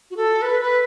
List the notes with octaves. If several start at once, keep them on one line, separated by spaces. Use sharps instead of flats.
F#4
A4
B4
B4